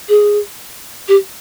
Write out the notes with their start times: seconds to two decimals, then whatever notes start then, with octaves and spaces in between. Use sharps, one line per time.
0.08 G#4
1.08 G4